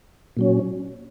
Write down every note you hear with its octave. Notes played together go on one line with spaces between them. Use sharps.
A#2 F#3 C#4